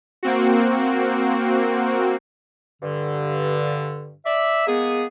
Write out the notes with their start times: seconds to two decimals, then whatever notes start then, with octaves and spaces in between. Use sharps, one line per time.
0.23 A#3 C4 F#4
2.82 G2 D3
4.26 D5 E5
4.67 G#3 A#3 B3 G#4